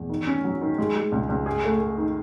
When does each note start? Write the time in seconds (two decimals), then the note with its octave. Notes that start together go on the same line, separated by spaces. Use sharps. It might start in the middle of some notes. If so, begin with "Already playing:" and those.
Already playing: E2
0.09 D#3
0.27 C#4
0.44 F#3
0.61 D#3
0.78 G#3
0.95 G#3
1.12 C#2
1.29 C#2
1.46 G#4
1.64 A3
1.81 A3
1.98 D#3